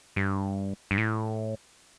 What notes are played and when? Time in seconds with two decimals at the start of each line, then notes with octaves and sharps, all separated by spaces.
0.16 G2
0.91 G2
0.98 A2